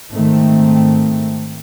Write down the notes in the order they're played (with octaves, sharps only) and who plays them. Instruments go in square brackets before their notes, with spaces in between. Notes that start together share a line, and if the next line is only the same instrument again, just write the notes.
[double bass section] G#2 D#3 A3 C4